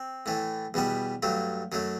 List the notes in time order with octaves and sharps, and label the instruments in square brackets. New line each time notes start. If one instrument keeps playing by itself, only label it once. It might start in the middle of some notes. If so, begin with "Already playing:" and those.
Already playing: [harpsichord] C4
A2 E3 A3
E2 B2 G3 B3
G2 F#3 A3
F#2 F#3 A3